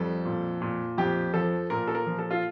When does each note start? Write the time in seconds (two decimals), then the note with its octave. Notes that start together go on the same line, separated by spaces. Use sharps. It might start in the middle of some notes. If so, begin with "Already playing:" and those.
Already playing: F2 G3 A4
0.25 A#2
0.62 A#2
0.98 F2 G4
1.33 F3 A4
1.70 A#2 A#4
1.88 A4
1.95 A#4
2.06 F3
2.19 A4
2.31 F4